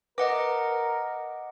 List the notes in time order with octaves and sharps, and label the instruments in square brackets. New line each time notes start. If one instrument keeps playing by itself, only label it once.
[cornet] A#4 [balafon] B4 [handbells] D#5 F#5 D6